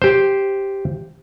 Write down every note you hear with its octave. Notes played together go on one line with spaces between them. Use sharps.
G4 C5